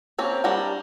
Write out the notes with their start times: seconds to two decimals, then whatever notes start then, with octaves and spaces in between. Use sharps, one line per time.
0.19 A#3 C4 C#4
0.44 G3 D4 A#4 F#5